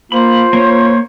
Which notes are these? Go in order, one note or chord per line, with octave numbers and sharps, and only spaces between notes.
A#3 F4 C5 B5
A#3 C#4 C#5